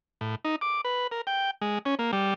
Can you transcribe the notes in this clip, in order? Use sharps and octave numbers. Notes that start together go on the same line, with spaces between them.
A2
D#4
D6
B4
A#4
G5
G#3
C#4
A#3
G3